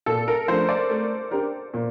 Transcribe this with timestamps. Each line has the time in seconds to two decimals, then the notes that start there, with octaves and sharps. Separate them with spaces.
0.06 A#2 A4
0.28 A#4
0.47 F3 A3 D4 C5
0.69 D5
0.90 A3
1.31 D4 G4 A#4
1.74 A#2